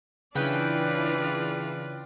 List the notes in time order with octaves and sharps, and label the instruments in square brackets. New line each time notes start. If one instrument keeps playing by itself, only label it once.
[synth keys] C#3 G5 F#6 [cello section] E3 D4 [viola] F4 D5 [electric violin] B4